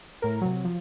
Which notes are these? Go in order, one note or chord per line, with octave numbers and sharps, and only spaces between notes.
A2 A#4
C3 F#3
F3